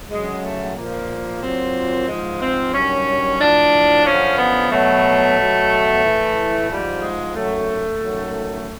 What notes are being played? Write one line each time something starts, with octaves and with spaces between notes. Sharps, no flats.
F#2 C#3 F#3 G#3
A3
A#2 F3 A#3
A#2 F#3 C4
G#2 F3 G#3
C4
G2 D#3 F#3 C#4
A2 F3 D4
F#2 D3 F3 C#4
B3
B2 F#3 A3
B2 F#3
A2 E3
G#2 F3 G3
G#3
F#2 D#3 F#3 A3
F#2 D#3 F#3